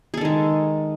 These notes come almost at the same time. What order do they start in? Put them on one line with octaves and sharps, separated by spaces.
G#4 A4 D#3 G#3